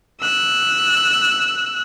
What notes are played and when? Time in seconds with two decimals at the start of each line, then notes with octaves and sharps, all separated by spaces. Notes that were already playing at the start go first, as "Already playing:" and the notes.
0.21 E6 F#6